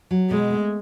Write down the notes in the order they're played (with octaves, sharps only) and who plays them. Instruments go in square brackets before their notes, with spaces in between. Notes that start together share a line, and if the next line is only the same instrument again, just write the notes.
[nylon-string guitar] F#3
[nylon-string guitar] B2 [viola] G#3
[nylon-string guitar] A3